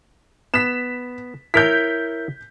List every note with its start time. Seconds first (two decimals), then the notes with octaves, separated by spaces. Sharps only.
0.54 B3 B6 E7
1.54 E4 A#4 C#5 G6 B6